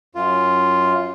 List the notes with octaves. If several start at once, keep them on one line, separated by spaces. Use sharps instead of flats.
F#2 F4